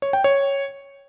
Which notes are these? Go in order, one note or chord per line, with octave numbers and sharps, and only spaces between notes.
C#5
G5
C#5